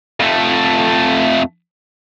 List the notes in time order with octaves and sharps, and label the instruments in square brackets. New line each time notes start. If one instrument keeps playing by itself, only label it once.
[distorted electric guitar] F2 A3